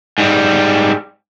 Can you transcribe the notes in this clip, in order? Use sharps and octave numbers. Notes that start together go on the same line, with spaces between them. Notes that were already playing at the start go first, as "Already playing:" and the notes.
G#2 G3